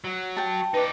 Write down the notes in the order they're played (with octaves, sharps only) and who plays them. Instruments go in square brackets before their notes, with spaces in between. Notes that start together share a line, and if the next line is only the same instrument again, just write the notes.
[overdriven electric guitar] F#3
[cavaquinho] G5 A5
[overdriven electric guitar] D#4 D5 [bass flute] B4